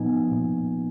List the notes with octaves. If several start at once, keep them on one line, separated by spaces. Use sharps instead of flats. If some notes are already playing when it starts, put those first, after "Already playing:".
Already playing: A#2 F3 B3 D#4 G#5
A#2